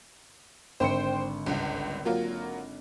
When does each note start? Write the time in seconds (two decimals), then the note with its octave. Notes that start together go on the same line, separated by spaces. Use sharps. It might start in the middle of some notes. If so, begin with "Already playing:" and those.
0.80 G#1 D3 C5 G5 C6 C#7
1.46 G1 C#2
2.05 F#3 A#3 F4